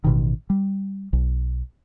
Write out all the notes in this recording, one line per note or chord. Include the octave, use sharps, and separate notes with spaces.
A1 B2 D#3
G3
B1